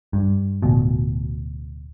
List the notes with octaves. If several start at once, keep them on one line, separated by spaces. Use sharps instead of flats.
G2
D1 D2 B2